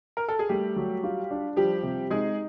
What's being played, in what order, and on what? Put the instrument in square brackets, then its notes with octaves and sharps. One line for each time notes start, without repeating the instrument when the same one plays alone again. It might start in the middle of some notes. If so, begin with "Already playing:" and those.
[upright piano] A#4
A4
G#4
[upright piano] G3 G4 [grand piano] A3
[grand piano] F#3
F4
D4
[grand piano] F3 [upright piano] G3 G4
[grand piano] C3
[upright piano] G#3 G#4 [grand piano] D#4